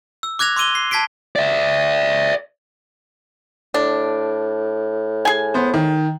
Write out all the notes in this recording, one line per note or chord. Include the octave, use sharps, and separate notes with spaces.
E6
D6 F#6 G#6 A#6 F7
C6 D6 E6 D#7 G7
C7
A5 G#6 B6 C7 D7
D5 E5
A2 D4
G#4 G#5
B3 C5
D#3